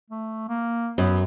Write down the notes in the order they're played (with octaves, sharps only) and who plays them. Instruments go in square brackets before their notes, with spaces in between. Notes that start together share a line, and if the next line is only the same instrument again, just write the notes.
[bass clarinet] A3
A#3
[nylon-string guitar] F#2 [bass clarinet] B3